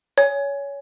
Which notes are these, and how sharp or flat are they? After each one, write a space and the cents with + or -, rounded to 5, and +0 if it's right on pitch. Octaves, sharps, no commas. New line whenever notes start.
C#5 +20 G#5 +0